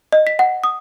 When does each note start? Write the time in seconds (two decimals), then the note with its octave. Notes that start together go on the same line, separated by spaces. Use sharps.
0.12 D#5
0.27 B6
0.39 F#5
0.64 D#6